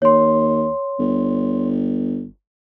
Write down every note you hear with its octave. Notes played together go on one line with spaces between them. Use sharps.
D#2 C#5 C6
G1